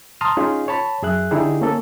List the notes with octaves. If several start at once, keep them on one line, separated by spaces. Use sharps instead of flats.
A5 A#5 C6 D#6 F6
C#4 D#4 F4 G#4
C#5 A5 B5
F#2 G#4 E5 F#6
D3 D#4 E4 G4 G#4
A#3 C#4 A4